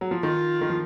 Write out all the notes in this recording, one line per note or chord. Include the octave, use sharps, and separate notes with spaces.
F#3
F3
D#3 F4
D#3
F3